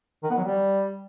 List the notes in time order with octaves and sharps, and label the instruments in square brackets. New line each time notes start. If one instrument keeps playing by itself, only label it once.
[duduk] D#3
B3
F#3
G3